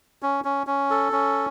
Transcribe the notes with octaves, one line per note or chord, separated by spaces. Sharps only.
C#4
C#4
C#4
A4
C#4